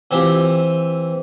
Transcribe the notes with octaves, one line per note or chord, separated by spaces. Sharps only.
E3 C4 F4 G4